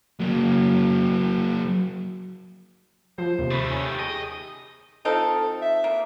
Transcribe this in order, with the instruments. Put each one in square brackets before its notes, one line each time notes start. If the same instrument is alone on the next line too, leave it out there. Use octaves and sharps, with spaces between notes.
[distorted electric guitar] F#3 A#3
[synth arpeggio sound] F3 [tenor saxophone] C5
[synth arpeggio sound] D#2 C3
[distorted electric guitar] D#3 A3 [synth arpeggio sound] B5 C#6
[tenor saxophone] C#4
G4
[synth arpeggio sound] G#4 [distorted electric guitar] D#5
[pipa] F3 C4 D#4 [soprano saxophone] A4
[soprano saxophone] E5
[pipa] A#3